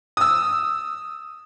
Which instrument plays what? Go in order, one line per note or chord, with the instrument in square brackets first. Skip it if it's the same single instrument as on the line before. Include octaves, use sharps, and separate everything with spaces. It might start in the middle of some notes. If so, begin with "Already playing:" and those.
[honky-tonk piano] D#6 E6